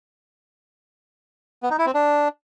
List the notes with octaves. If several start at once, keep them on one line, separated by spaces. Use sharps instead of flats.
B3
D#4
E4
C4
D4